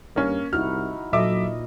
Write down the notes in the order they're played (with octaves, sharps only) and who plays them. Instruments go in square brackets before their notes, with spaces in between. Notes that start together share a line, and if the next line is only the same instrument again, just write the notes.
[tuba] G2 [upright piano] A#3 C#4
[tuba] C2 [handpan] D#4 E4 F#4 [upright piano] F6
[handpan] A#2 D#5 [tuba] F#3 [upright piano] A4 E5 D6